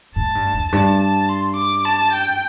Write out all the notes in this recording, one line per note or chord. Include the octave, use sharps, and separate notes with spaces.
A2 A5
G2
E2
G2 A5
A5
C6
D6
A5
G5